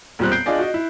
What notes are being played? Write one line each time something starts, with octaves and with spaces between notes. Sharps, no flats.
E1 A#2 G3 C4 F#6
G6 C7 D7
D4 F4 G#4 D5 D#5
F#4 D#5
E4